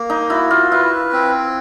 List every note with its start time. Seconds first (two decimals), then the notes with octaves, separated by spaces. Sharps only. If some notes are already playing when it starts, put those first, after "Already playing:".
Already playing: A#3
0.10 D#4
0.29 E4 F#4
0.51 F4
0.71 E4 B4
1.12 C4